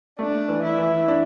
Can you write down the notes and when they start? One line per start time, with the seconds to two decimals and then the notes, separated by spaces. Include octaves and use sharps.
0.19 A3 D4
0.48 E3
0.63 E4
0.78 E3
1.08 D4